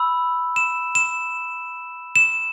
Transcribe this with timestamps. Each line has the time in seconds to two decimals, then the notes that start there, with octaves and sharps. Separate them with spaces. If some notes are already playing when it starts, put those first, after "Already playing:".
Already playing: B5 E6
0.56 E7
0.95 E7
2.16 E7